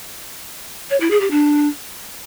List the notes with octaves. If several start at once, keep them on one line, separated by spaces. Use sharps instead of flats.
C#5
E4
G#4
G4
D4